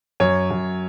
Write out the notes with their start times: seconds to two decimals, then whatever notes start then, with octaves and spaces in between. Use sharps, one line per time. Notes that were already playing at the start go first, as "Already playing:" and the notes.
0.20 F#2 C#5
0.51 F#2